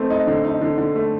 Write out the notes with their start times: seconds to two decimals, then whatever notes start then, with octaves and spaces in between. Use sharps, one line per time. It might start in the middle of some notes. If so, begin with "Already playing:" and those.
Already playing: A3 C4 D#4
0.10 D#4
0.27 D3
0.45 D#4
0.61 D3
0.78 D3
0.95 A3